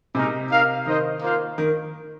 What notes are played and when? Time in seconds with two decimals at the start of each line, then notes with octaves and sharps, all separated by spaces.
0.15 C3 G#3 D#4 A#4
0.50 D#4 A#4 F5
0.86 D#3 D#4 C5 D#5
1.22 A#3 F4 C5 F5
1.58 D#3